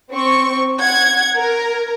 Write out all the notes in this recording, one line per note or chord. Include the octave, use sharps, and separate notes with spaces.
C4 C#6
F#5 G#6
A#4